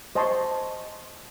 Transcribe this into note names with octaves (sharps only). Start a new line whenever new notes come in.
C5 D#5 G#5 A5 C6 C#6